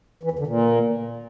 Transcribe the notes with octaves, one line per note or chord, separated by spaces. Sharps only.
E3
E2
D3
A#2